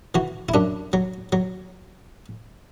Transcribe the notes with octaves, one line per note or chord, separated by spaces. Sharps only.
E3 F#4
E4
F#2 D4
F#3
F#3